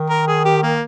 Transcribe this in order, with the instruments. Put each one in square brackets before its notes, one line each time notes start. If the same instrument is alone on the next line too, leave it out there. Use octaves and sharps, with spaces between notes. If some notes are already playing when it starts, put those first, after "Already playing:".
Already playing: [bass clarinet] D#3
[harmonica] A#4
G#4
G4
A#3